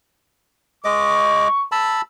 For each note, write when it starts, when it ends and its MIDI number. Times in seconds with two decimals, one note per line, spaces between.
0.85 1.48 56
0.85 1.48 75
0.85 1.65 85
0.85 1.48 86
1.72 2.01 81
1.72 2.01 83
1.72 2.01 88